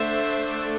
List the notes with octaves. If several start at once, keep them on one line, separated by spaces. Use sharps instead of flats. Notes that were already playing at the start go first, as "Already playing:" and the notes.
Already playing: D3 A3 D4 C5 E5